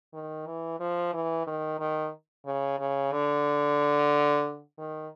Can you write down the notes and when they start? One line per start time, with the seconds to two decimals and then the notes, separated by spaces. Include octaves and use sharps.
0.13 D#3
0.46 E3
0.80 F3
1.13 E3
1.47 D#3
1.79 D#3
2.46 C#3
2.79 C#3
3.12 D3
4.78 D#3